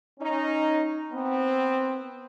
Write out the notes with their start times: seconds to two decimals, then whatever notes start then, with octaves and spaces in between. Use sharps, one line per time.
0.20 C#4 D#4
1.12 B3 C4